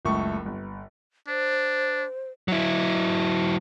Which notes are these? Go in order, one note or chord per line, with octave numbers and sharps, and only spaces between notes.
F#1 C#2 A3 C#6
G1
D4 C5
F#3 E4